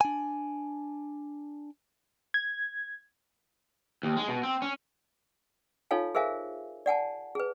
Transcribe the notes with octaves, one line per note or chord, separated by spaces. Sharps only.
D4 G#5
G#6
D#2
G#3
B2
C4
C#4
D#4 F4 A4 C#5 F5 G#5
G#4 A#4 C5 E5 F5 G#5
D5 F#5 G#5 A5
G#4 B4